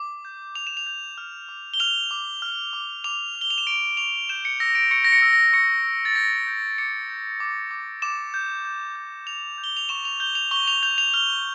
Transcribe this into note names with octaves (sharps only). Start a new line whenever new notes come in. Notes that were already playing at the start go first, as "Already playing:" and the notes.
Already playing: D6
G6
D6 F7
E7
F7
G6
F6
D6
G7
F6 F7
D6
F6
D6
D6 F7
F6
G7
F7
E7
C#6 D7
C#6 F7
G6 E7
C#7
E6 A#6
D7
C#6 C#7
A#6
C#7
E6
A#6
C#6 C#7
E6
A6
G6 A#6
G6
D6 C#7
G6
D6
D6
D6 E7
G6
G6
G6
G6 F7
G6
G7
F7
C#6 E7
F7
G6 G7
F7
C#6 G7
F7
G6 F7
F7
F6 G7